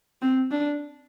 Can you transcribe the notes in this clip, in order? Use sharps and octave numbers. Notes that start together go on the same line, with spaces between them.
C4
D4